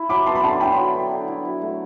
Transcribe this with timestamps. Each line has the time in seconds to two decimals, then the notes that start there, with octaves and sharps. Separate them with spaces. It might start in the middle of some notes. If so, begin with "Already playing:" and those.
Already playing: E4
0.09 F#3 B5 D6
0.26 B3 A5 C6
0.35 B5
0.43 D3 A5 C6
0.60 E4 G5 B5
0.77 F#3
0.94 B3
1.11 D3
1.28 E4
1.45 F#3
1.62 A3